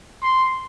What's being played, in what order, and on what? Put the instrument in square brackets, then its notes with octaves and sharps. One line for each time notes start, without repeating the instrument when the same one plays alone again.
[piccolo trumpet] C6